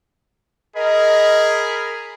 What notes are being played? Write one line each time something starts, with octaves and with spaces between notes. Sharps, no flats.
G#4 A#4 D#5 B5